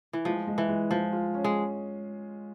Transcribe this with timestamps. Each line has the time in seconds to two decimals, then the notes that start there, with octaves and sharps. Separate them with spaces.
0.13 E3
0.25 F3 G#3
0.47 G#3
0.58 E3
0.68 G#3
0.91 F3 G#3
1.13 F4
1.34 C#4
1.44 G#3